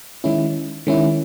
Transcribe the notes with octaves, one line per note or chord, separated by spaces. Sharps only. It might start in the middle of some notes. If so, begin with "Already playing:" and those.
D#3 G#3 C#4 E4
D#3 G#3 C#4 E4